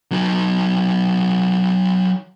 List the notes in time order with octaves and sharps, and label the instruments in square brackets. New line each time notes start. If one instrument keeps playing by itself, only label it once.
[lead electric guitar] F#3 D#4